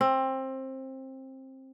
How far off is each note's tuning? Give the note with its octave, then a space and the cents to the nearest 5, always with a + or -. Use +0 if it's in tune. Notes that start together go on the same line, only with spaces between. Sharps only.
C4 +20